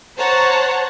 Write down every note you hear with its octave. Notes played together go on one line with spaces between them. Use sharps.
C5 C#5 F#5 A5 A#5